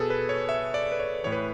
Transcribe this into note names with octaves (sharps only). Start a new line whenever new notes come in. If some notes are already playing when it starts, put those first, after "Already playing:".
Already playing: B2 G#4 A4 B4
B4
C#5
E5
D5
B4
C#5
A2 E3 C#5
B4